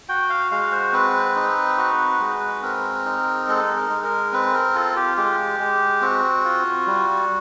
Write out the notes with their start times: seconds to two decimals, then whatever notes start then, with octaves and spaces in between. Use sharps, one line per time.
0.09 F#4 G5
0.30 F5
0.51 G#3 F5
0.72 C5
0.93 C4 B4
1.36 D#4
1.78 F#4
2.20 G#3
2.62 C4 A#4
3.05 D#4
3.48 G#3 A4
3.76 A#4
3.90 G#3
4.04 A#4
4.33 C4 B4
4.54 A#4
4.75 F4 A4
4.96 G4
5.17 G#3 G4
5.59 G#3
6.02 C4 F#4
6.45 F4
6.87 G3